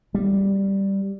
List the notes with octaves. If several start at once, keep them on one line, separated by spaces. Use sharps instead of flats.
G3